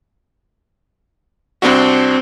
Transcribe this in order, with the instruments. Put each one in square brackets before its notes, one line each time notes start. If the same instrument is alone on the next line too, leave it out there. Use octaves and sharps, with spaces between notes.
[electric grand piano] C2 D4 F#4 [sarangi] C4